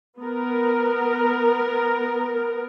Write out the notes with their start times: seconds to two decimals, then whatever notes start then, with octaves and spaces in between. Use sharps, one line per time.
0.19 B3 A#4